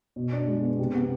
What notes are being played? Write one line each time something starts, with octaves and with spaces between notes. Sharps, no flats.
B2
D4
G#3
B3
C3
B3